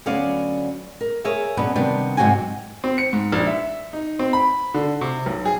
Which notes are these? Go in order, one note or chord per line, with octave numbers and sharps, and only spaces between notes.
D2 F#3 B3 C#4 D5 F5
A#4
G#4 A#4 C#5 E5 F5
F#2 B2 B3 C#4 D4 B4
C3 D#3 G3 B3 D4
G#2 C3 F#3 C4 F#4 G#5
C4
C#7
G#2
A#1
E5
D#4
C4
B5
D3
C3
B1
G#4